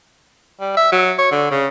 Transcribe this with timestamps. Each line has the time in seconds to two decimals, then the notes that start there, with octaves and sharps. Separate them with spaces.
0.60 G3
0.77 E5
0.92 F#3
1.18 C#5
1.31 D3
1.51 C#3